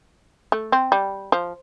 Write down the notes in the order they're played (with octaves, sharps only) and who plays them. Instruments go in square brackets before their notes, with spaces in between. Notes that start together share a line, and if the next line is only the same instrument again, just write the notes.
[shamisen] A3
C4
G3
F3